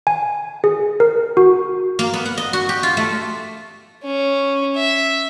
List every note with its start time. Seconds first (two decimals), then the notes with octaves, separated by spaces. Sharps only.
0.07 G#5
0.64 G#4
1.00 A#4
1.37 F#4
1.99 A#3
2.14 B3
2.25 F#5
2.37 D#5
2.53 F#4
2.69 G4
2.83 F4
2.97 A3
4.04 C#4
4.76 E5